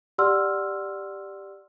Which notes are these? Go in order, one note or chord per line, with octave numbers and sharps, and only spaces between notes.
G4 D5 F#5 C6 E6 F6